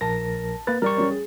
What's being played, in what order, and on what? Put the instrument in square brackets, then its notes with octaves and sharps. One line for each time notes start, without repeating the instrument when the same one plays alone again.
[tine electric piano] A#1 A#4 A#6 [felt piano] A5
[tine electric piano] A#3 B4 [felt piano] A6
[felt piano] G3 [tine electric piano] A#4 D5 C#6
[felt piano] G3 C#4
G#4